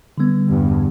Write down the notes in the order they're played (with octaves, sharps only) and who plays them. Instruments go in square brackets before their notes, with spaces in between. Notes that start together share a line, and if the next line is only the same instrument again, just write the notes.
[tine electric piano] D3 G3 B3
[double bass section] E2 G2